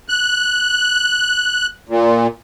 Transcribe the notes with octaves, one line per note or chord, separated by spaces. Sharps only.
F#6
A#2